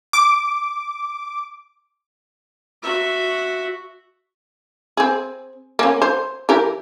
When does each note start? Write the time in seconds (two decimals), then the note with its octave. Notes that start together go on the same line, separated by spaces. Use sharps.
0.13 D6
2.83 F#4 E5
4.97 C4 G#4
5.79 A#3 C#4
6.02 C5
6.49 E3 G4 A#4